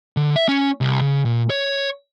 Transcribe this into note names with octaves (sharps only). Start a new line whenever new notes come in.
D3
E5
C#4
C2
C#3
A#2
C#5